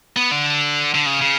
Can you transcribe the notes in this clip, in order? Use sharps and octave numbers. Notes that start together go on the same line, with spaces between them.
B3
D3
D3
C#3
C#3